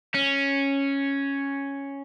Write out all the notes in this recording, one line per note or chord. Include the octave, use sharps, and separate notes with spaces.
C#4